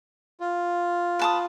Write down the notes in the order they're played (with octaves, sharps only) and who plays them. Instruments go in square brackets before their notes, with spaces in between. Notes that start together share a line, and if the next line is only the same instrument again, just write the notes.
[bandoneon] F4
[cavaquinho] B4 A5 D#6